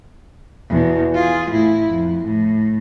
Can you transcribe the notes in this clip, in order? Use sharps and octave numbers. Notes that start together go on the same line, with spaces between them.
E2 B2
F4 G#4
A2 E4
F2
A2